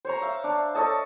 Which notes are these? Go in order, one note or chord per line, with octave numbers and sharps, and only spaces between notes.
C5 C#5 A#5
E5 F5
D4
A4 C#5 D#5 A5